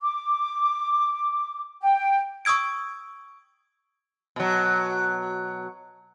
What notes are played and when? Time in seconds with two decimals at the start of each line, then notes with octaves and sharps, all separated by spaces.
0.01 D6
1.82 G5
2.45 C#6 D#6 E6 G#6 D7
4.36 B2 F#3